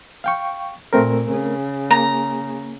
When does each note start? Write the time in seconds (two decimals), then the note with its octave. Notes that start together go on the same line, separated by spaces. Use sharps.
0.24 F5 G5 C#6
0.93 A#2 A3 C4 A#4
1.29 C#3
1.91 A#3 A#5